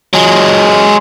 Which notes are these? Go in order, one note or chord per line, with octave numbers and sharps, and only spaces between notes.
F#3 G#3